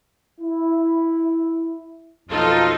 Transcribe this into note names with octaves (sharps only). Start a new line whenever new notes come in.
E4
B1 F2 D#4 F4 A4